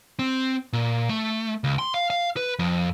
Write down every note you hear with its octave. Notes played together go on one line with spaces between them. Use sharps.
C4
A#2
A3
C#2
C6
F5
F5
B4
F2